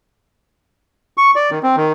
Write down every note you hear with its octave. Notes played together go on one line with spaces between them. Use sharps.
C#6
D5
D#3
C4
D#3